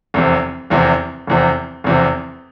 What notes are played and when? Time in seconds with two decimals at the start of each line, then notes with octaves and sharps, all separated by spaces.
0.14 F1 E2 C3
0.70 F1 E2 C3
1.27 F1 E2 C3
1.84 F1 E2 C3